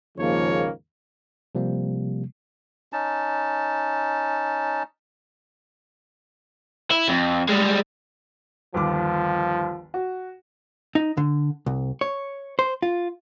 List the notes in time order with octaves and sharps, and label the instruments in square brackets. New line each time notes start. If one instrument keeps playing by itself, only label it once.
[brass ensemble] D#2 G#2 C#3 F3 A#3 C#5
[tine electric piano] C3 F3 G3 A#3
[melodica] C#4 D#4 A5
[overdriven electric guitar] E4
F2
G3 G#3
[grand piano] G1 D#2 D6 [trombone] F3
[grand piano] F#4
[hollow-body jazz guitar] D#4
D3
C2
C#5
C5
F4